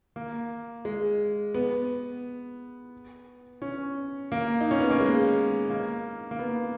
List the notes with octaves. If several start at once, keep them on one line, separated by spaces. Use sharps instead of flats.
A#3
G#3
B3
C#4
A#3
D#4
C#4
B3
A#3
G#3
A#3
A#3
B3